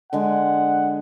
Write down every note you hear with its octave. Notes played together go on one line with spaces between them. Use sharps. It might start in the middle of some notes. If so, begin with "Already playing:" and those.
D3 G#3 F#5